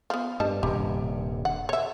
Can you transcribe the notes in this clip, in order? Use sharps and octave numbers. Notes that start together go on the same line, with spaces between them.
F3 B3
G2 G3 D#5 A5
D#1 G2 C3 G4
F#5
C#5 E5